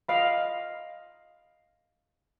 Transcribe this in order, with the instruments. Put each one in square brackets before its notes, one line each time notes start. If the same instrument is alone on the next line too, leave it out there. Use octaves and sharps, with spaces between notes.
[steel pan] D#5 F5 B5